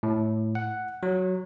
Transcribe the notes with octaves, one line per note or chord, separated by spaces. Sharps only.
A2
F#5
F#3